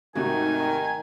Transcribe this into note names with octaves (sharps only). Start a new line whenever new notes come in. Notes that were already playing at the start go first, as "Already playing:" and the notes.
G#1 C3 D#3 A3 D#4 F#4 G#5